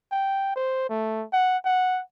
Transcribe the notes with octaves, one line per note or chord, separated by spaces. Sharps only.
G5
C5
A3
F#5
F#5